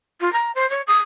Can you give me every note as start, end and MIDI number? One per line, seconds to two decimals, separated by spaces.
0.20 0.32 65
0.32 0.51 82
0.55 0.68 72
0.70 0.81 73
0.87 0.98 87